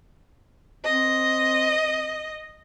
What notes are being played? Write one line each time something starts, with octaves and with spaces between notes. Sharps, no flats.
C4 D#5